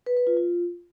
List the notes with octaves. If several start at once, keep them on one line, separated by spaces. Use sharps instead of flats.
B4
B4
F4
F4